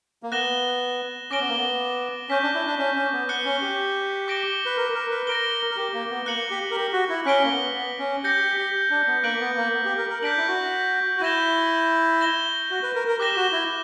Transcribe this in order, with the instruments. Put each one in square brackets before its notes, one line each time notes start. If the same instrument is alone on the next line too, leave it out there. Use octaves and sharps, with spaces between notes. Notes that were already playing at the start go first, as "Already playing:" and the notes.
[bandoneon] A#3
[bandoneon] B3 [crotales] F#6 A#6 E7 G7
[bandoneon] C#4 [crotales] D6 A#6 D7 G7
[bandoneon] B3
A#3
B3
[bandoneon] C#4 [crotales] C#6 G6 B6
[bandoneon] D4
E4
D4
C#4
C#4
B3
[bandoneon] B3 [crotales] F#6 C#7 G7
[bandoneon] C#4
G4
[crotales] D6 A#6 D7 G7
[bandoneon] B4
A#4
A#4
B4
[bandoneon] A#4 [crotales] A#6 D7 G7
[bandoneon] A#4
G4
A#3
B3
[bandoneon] A#3 [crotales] F#6 C#7 F#7
[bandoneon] G4
A#4
G4
F#4
E4
[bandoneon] C#4 [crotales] F#6 B6 D7 G7
[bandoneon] A#3
B3
B3
C#4
[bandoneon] G4 [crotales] G6 A#6 C#7
[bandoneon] G4
G4
D4
B3
[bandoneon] A#3 [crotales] F#6 B6 D7 F#7
[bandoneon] B3
A#3
B3
G4
A#4
A#4
[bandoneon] D4 [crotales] G6 B6 D7 F#7
[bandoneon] E4
F#4
F#4
[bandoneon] E4 [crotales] C#6 G6 A#6 E7 G7
[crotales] A#6 E7 G7
[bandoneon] F#4
B4
A#4
A#4
[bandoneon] G4 [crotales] D6 F#6 A#6 E7 G7
[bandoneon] F#4
E4